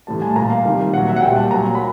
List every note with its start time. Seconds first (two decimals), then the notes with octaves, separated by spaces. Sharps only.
0.07 A2 E3 G3 A5
0.22 G#5
0.30 A5
0.36 A#2 G3 A#5
0.50 F5
0.65 C3 D#3 G3
0.93 A#2 F#5
0.98 F#3
1.09 E5
1.16 F#5
1.22 A#2 G3 G5
1.36 A5
1.51 A#2 F#3 A#5
1.75 B5